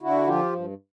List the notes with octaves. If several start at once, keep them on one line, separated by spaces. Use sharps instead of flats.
D3 E4 F#4
F3 F4 G4
G2